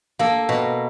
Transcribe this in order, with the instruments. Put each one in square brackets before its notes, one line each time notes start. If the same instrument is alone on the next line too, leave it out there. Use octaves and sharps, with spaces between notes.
[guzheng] A#3 A4
B2